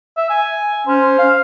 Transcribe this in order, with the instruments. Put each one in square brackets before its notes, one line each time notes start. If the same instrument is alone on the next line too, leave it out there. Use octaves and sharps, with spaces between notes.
[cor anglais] E5
G#5
[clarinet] C#4 [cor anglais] C5
[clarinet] F5